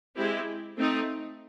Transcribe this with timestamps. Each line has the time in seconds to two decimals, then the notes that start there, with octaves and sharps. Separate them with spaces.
0.15 G#3 C4 E4 G4
0.76 A3 C4 D#4